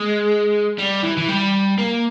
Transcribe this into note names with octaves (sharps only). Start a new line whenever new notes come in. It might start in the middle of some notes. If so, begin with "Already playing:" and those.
Already playing: G#3
G3
E3
E3
G3
A#3